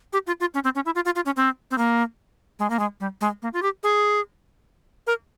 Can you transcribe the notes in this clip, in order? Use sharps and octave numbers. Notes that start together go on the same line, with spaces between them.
G4
F4
F4
C#4
C4
C#4
E4
F4
F4
F4
C#4
C4
C4
A#3
G#3
A#3
G#3
G3
G#3
A#3
F4
G4
G#4
A#4